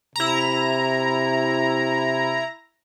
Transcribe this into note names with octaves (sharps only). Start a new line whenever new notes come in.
C3 E4 A#5